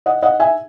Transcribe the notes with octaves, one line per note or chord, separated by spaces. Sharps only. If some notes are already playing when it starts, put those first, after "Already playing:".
D#5 F#5
D#5 F#5
E5 G#5